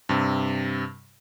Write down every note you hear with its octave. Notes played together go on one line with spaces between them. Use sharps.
G2 C3